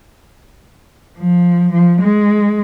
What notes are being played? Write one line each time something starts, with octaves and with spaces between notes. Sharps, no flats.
F3
F3
G#3